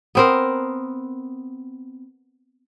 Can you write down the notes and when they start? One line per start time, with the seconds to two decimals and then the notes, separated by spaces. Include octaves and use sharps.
0.15 B3 C4 A#4